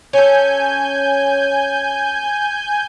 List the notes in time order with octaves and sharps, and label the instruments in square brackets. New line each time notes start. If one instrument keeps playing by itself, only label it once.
[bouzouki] C#4 A4 [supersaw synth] G#5 G6